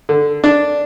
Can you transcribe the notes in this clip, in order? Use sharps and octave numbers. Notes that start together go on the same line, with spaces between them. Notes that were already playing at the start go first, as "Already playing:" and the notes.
D3
D4